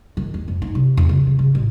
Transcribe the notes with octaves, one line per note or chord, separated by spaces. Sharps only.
D#3
D#2
F2
D#4
C3
E2
C#3
C#3
C#3
A1